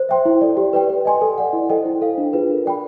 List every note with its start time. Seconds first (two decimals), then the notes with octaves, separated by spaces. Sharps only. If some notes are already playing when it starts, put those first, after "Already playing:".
Already playing: C5
0.09 E5 G5 C6
0.25 E4
0.41 A4 D5
0.57 G4
0.73 B4 D5 G5
0.90 B4
1.05 D#5 G#5 C6
1.21 A4
1.38 D5 F#5
1.53 E4
1.69 A4 C5 D#5 G5
1.85 E4
2.01 A4 C5 F5
2.18 D4
2.33 F4 G#4 B4
2.50 A#4
2.66 D5 G5 B5